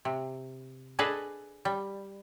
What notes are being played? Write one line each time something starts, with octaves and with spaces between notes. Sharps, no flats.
C3
D4 G#4 A4 B4 D#5
G3